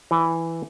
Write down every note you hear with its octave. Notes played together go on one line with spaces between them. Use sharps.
E3